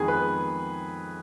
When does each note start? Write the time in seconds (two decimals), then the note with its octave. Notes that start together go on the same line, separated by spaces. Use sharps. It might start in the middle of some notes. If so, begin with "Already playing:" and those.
Already playing: F2 D#3 G#3 B3 G#4
0.08 B4